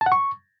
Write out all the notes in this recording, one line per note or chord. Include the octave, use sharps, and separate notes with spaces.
A5
F#5
C#6